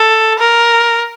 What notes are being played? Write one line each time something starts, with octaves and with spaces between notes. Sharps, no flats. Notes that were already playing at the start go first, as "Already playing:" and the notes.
Already playing: A4
A#4